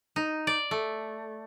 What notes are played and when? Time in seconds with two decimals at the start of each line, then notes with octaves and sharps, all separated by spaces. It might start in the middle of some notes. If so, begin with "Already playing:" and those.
0.16 D#4
0.47 D5
0.71 A3